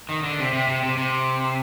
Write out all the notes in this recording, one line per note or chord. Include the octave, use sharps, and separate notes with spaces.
D#3
D3
C3
C3
C3
C3
C3